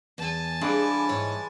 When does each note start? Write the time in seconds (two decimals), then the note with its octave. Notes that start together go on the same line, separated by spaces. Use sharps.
0.18 E2 G#5 A5
0.61 E3 G3 G#3 D4 A4 F5
1.09 G#2 E4 C#5